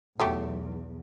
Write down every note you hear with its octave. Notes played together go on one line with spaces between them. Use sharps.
B1 E2 F#3 A3 G4